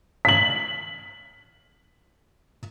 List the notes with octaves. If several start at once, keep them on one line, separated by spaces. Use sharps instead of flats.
B6 F#7